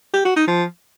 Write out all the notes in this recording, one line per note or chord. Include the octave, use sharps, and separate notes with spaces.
G4
F#4
D#4
F3